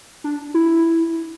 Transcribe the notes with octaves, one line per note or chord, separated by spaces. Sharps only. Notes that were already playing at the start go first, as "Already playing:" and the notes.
D4
E4